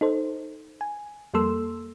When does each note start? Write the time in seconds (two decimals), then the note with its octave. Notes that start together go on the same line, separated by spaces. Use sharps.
0.01 D#4 A4 C5
0.81 G#5
1.34 F2 G3 A#3 A4 C6 E6